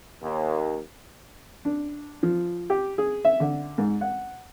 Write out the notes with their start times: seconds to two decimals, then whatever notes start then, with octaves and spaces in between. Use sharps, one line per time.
0.22 D#2
1.65 D4
2.23 F3
2.70 G4
2.98 G#4
3.25 E5
3.40 D3
3.78 G#2
4.01 F#5